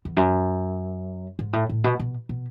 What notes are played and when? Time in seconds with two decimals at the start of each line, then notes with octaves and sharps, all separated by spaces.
0.05 E2
0.17 F#2
1.39 G#2
1.53 A2
1.69 A2
1.84 B2
1.99 B2
2.29 B2